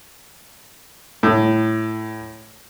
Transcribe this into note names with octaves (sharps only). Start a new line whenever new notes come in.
A2